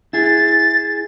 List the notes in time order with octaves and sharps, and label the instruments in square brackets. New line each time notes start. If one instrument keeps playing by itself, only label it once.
[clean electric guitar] E4 G#4 [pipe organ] A6